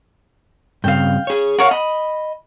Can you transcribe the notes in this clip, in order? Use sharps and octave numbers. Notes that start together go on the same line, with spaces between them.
G2 C#3 C4 F5 G5
G#4 C#5
A#4 C#5 F5 F#5
D#5 B5